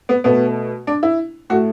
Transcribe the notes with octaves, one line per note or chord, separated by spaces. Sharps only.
B3
B2 A3 B3
D4
E4
A2 A3 F#4